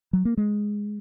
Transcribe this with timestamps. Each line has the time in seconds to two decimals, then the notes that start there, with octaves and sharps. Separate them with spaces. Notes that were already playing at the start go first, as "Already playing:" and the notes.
0.13 F#3
0.25 A#3
0.37 G#3